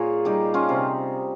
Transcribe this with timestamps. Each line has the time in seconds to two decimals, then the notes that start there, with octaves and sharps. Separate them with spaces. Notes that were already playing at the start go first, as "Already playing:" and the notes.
Already playing: A#2 F4 G#4 A#4 C#5
0.25 G3 D#4 G4
0.54 C#4 F4
0.69 C3